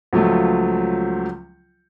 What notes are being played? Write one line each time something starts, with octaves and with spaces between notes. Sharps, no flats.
C#2 F3 F#3 A3